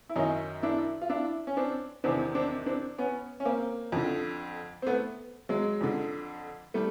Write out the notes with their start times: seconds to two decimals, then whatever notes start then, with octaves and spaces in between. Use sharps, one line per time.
0.09 E4
0.16 F#2 D#3 C#4 D#4
0.63 D4 E4
1.01 F4
1.09 D4 E4
1.47 C#4
1.57 C4 D4
2.04 E2 C3 D#3 C4 D4
2.35 C4 D4
2.66 C4 D4
2.98 B3 C#4
3.40 C#4
3.45 A#3 C4
3.92 F2 D3
4.82 C4
4.87 A3 B3
5.49 F#3 G#3
5.81 F2 D3
6.74 G3 A3